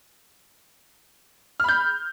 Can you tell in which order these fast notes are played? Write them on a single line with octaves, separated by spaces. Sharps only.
F6 B5 G6